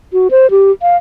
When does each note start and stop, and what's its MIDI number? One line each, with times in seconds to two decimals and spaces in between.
0.13 0.28 66
0.31 0.50 72
0.51 0.71 67
0.82 0.97 77